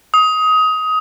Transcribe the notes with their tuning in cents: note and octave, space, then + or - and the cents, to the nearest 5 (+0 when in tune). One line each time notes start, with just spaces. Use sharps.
D#6 +20